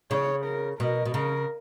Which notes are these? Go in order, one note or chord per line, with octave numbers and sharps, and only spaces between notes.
C#3 C#5
A#4
B2 A#4
B2
C#3 A#4